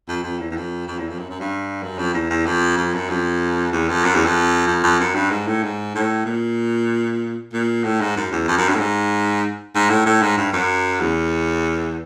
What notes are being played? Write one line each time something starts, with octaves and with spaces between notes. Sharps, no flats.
F2
F2
E2
E2
F2
F2
E2
F2
F#2
F#2
G2
F#2
F2
E2
E2
F2
F2
F#2
F2
E2
F2
F#2
E2
F2
F2
F2
F#2
G2
G#2
A2
G#2
A2
A#2
A#2
A2
G#2
F#2
E2
F2
F#2
G2
A2
G#2
G#2
A2
A2
G#2
G2
F#2
E2